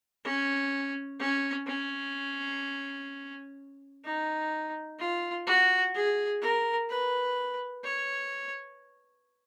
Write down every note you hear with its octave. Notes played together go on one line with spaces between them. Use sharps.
C#4
C#4
C#4
D#4
F4
F#4
G#4
A#4
B4
C#5